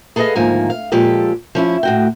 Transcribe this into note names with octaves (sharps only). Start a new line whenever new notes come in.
G#4 A4 B4 C#5 D#5 F5
D2 G#2 D#3 F3 A#3 G#5
F5
A#2 F3 G#3 G4 A4
F3 C#4 E4
A2 F#4 G5